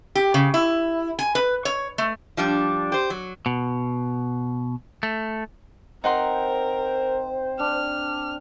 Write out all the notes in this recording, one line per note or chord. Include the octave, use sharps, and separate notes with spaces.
G4
C#3
E4
G#5
B4
C#5
A3
F3 G3 D4
G4 C5
F#3
B2
A3
C4 D#4 A#4 C5 F#5 C6
D4 F6